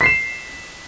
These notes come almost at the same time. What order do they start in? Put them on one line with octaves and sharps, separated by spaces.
B6 C7 E7